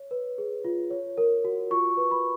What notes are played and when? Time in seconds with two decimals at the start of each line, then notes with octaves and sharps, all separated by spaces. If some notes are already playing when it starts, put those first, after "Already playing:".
Already playing: C#5
0.11 B4
0.38 G#4
0.65 F4
0.90 C#5
1.17 A#4
1.45 F#4
1.71 F4 C#6
1.97 B4
2.11 B5